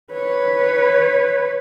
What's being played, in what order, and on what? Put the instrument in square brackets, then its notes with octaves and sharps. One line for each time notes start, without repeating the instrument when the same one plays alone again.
[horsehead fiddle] B4 C#5